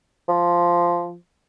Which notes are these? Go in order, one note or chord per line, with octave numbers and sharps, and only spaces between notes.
F3